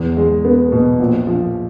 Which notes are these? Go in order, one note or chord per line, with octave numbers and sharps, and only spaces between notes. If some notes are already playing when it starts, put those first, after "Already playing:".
Already playing: E2
G#3
B3
B2
A#1
F3